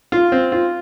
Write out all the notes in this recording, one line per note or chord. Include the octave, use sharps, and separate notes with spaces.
F4
C4
F4